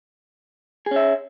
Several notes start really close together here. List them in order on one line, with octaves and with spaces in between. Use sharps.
G#4 C#4 E5